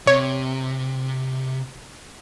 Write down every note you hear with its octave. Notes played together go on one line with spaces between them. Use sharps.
C3 C#5